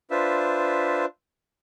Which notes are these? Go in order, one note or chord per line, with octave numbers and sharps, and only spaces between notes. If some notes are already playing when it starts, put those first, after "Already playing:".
D4 F4 B4 C5 E5